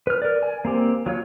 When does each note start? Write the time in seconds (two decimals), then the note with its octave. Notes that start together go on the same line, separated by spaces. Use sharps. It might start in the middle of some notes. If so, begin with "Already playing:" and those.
0.07 B4 F6
0.22 A#4 D5
0.43 G#5
0.65 A#3 C4 G4
1.06 F#3 F4 C#5